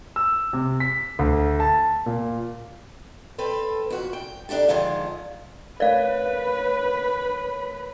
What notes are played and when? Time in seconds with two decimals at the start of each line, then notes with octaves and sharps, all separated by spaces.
0.16 E6
0.53 C3
0.80 B6
1.19 D2
1.60 A5
2.06 A#2
3.38 C4 A4 B4
3.90 F2 F#4
4.13 G5
4.49 D4 D#4 G4 A4
4.68 G#2 D3 D#3 F3 G#3 D4
5.80 A3 A#4 B4 C#5 D5 F5 B5